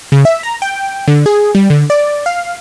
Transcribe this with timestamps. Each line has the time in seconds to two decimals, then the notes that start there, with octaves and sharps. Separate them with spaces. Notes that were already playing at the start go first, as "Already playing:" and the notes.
0.12 C#3
0.25 E5
0.43 A#5
0.62 G5
1.08 D3
1.26 G#4
1.55 G3
1.70 D3
1.90 D5
2.26 F5